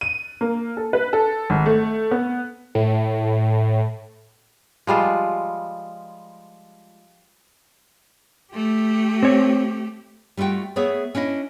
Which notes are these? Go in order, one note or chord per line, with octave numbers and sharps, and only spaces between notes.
D#7
A#3
A4
B4
A4
G#1
A3
B3
A2
F3 G3 G#3 F4
A3 G4
C4 C#5
G3 A3 F4 F#4 G5
A3 B3 G#4 C#5 D5 E5
C#4 D4 E4 D#5